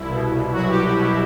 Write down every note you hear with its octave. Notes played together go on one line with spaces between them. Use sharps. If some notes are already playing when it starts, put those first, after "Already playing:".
Already playing: C2 E4
B2
C2
F#3 F#4
G4
C2
F#4
B2 E4